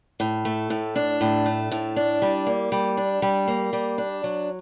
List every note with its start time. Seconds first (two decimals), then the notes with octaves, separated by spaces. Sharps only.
0.20 A2
0.45 A3
0.70 A2
0.96 D4
1.21 A2
1.45 A3
1.71 A2
1.96 D4
2.22 G3
2.47 A#3
2.72 G3
2.97 D4
3.22 G3
3.48 A#3
3.73 G3
3.98 D4
4.24 F#3